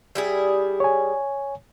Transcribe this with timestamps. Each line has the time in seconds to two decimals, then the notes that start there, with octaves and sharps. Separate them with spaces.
0.15 G3 E4 G#4
0.80 C#5 G#5